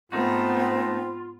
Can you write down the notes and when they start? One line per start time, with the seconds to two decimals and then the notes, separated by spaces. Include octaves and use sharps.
0.12 G#2 A3 B3 C4 D#4 F4 F#4